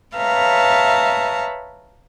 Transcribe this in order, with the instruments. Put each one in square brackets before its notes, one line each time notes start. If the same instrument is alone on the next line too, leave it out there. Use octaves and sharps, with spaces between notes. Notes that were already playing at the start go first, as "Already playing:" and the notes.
[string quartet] B4 C#5 E5 F5 A5 A#5